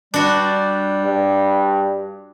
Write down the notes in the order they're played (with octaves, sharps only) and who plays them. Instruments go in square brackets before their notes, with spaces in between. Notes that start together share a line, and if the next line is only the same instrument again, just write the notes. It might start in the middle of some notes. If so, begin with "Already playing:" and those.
[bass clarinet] G3 [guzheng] D4 F#4
[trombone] G2